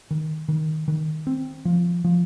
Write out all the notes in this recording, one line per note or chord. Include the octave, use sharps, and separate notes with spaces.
D#3
D#3
D#3
C4
F3
F3